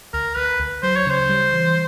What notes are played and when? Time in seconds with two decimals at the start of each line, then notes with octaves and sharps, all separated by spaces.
0.14 D2 A#4
0.37 D2 B4
0.60 D2
0.83 F#3 C5
0.96 C#5
1.06 C#3 C5
1.29 G3
1.53 E3